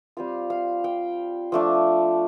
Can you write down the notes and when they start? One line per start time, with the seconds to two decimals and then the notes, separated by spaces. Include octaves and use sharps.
0.17 G3 C4 F4 F5
0.50 F5
0.84 G5
1.52 F3 A3 D4